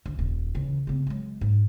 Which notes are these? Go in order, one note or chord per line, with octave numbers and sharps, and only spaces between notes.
D2
D#1
C#3 E3
C#3 C4
F#3 G#3
G#2